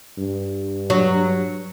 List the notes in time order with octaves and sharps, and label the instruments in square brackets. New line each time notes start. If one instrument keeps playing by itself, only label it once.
[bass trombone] G2
[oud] F#3